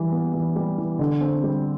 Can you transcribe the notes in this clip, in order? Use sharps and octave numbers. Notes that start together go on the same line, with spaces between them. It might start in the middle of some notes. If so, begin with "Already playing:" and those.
Already playing: E3 G3
B3
E3
G3
E3
D3
C4
G3